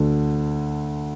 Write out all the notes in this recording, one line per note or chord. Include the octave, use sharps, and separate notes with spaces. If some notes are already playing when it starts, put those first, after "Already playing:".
Already playing: D2 D3